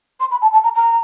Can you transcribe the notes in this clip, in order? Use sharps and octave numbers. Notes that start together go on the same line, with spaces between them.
C6
B5
A5
A5
A#5
A#5